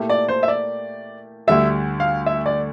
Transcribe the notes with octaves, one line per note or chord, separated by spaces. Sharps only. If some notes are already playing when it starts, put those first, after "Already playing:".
Already playing: A#2 A3 E4 G4 A#4
D5
C5
E5
D5
D2 D3 G3 E5
F5
E5
D5